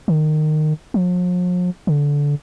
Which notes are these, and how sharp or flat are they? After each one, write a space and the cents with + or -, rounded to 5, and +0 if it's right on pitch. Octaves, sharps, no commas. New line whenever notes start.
D#3 -20
F3 +45
D3 -20